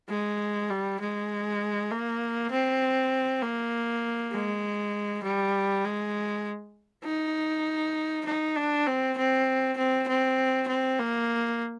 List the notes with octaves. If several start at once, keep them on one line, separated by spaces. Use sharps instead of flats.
G#3
G3
G#3
A#3
C4
A#3
G#3
G3
G#3
D#4
D#4
D4
C4
C4
C4
C4
C4
A#3